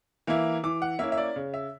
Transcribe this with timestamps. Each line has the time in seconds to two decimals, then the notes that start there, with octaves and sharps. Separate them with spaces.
0.27 E3 A#3 E4
0.63 E3 D6
0.82 F#5
0.99 A#3 C#4 E4 E5
1.12 E5
1.18 D5
1.36 C#3
1.54 E5